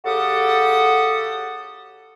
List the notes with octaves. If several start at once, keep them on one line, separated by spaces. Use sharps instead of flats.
C#3 F#4 G4 A4 F#5 D#6